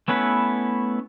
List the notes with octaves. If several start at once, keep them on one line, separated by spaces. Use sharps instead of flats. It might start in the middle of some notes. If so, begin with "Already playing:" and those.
A3 B3 C#4 E4 B4